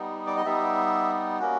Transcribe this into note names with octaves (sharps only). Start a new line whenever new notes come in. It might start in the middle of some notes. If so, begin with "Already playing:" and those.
Already playing: G3 B3 D#4
D5
D#5
G3 B3 D#4 E5
A#3 C#4 F#4